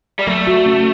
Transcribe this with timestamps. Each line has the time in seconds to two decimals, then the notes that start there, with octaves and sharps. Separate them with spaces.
0.19 G3
0.27 F#3 A3
0.47 F#4
0.66 C#4